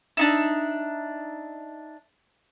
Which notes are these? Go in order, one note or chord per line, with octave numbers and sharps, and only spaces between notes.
D4 D#4 E5